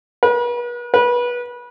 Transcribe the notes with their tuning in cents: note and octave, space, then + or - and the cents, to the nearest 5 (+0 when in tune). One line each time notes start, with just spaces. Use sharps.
B4 -40
B4 -25